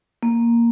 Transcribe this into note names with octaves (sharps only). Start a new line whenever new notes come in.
A#3